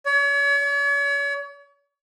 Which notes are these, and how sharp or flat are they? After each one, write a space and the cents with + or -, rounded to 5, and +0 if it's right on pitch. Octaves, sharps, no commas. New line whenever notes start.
C#5 +40